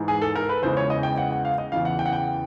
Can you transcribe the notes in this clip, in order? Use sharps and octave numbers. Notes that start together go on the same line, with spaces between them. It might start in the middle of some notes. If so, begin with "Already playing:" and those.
Already playing: G#2 E3 G#3
G#4
A4
A#4
B4
E2 C#3 E3 G#3 C5
C#5
D#5
G5
F#5
F#5
F5
D#5
E2 C#3 E3 F5
F#5
G5
F#5
G5